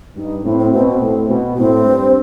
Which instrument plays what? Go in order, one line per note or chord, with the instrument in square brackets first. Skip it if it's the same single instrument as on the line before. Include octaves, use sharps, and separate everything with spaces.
[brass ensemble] G2 [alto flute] D#4
[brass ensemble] A2 [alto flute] C4
[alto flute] C4
[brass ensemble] B2 [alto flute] C4
[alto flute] C4
[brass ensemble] A2
B2
[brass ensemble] A2 [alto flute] C4
[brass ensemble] G2